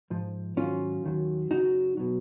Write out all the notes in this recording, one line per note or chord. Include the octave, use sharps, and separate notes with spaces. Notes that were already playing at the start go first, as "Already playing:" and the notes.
G#2 F3
G#2 D#3 F#3 C#4 F4
D#2 D#3 F#3
F#2 C#3 F#3 D#4 F#4
B2 F#3